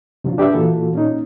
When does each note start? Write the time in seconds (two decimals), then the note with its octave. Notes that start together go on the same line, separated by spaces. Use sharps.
0.24 C3 F3 F#3 D4 F4
0.38 D4 G4 B4 D5 E5
0.53 A#2 E3 A#3 F4 F#4 A4
0.93 A#2 C#4 D#4